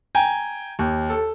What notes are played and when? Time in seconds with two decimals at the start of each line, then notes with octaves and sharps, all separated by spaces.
0.15 G5 G#5 A#5
0.79 D#2
1.10 A4